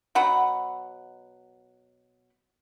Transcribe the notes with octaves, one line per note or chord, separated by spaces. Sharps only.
B2 F#3 F#5 B5